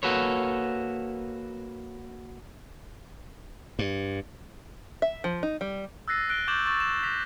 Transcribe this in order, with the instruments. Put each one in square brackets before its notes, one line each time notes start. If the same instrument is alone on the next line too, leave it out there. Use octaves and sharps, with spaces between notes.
[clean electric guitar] A#3 F#4 A4 B4 C#5
[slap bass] G2
[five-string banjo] E5
F3
D#4
G3
[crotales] E6 F#6 A6 A#6 C7 D#7
F#6 C7 D7 G7
C#6 D6 G6 A6 E7 F#7
C#6 A6
F6 E7
D6 A#6 B6 F7